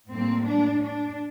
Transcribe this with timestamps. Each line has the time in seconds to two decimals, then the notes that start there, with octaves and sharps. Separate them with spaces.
0.10 A2 G3 A#3 C4
0.46 D4
0.82 D4